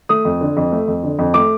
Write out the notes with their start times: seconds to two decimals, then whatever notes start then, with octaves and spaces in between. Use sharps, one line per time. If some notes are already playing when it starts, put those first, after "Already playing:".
0.09 A3 D#6
0.25 F2
0.41 D3
0.57 F2
0.72 A3
0.88 F2
1.03 D3
1.19 F2
1.34 A3 D6